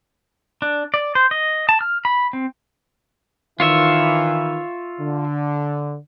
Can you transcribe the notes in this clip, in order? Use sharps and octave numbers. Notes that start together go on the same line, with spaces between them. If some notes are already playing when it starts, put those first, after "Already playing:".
D4
D5
C5
D#5
A5
F6
B5
C4
D#3 E3 F4 C#5 E5
D3